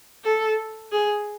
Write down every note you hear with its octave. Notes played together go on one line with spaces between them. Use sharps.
A4
G#4